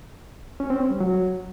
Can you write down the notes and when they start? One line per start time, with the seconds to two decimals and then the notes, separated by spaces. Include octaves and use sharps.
0.60 C#4
0.70 C4
0.80 C#4
0.90 G3
1.00 F#3